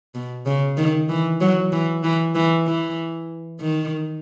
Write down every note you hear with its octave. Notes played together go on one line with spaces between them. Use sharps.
B2
C#3
D#3
E3
F#3
E3
E3
E3
E3
D#3